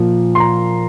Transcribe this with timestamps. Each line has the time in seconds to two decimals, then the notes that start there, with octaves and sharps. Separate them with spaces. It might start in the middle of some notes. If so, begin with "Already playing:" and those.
Already playing: A#2 F3
0.35 C6
0.40 A#5